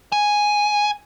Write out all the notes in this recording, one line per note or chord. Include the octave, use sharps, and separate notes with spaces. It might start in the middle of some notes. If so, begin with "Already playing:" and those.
G#5